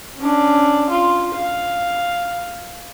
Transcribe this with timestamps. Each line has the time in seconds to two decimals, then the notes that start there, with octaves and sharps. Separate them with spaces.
0.17 C#4 D4
0.90 F4
1.35 F5